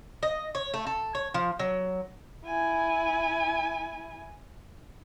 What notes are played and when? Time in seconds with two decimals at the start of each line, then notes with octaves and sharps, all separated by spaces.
0.23 D#5
0.55 C#5
0.74 A3
0.86 A4
1.15 C#5
1.34 F3
1.59 F#3
2.45 E4 G#5